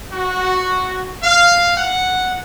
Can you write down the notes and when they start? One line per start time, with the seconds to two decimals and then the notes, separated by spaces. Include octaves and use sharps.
0.12 F#4
1.23 F5
1.77 F#5